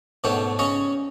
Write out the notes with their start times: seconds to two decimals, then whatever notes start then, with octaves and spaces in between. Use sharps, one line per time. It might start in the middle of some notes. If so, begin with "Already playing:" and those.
0.24 G#2 B2 D3 A3 C#5 G5
0.59 C#3 C#4 C#5 D#5